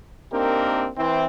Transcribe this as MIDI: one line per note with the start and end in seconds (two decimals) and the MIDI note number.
0.33 0.89 58
0.33 0.89 60
0.33 0.89 62
0.33 0.89 63
0.33 0.89 67
0.33 0.89 70
0.97 1.27 52
0.97 1.27 60